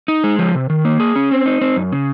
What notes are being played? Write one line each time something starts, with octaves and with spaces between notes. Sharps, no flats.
D#4
G#3
F3
C3
D#3
A#3
G#4
C#4
C4
D#4
C4
F#2
C#3